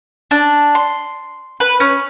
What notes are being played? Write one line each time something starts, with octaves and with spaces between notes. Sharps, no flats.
D4
C6
B4
C#4